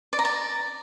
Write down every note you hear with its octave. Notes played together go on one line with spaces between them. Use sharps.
D5
A#5
D5